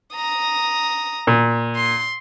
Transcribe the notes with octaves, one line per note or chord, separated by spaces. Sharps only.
A#5 D#6
A#2
C6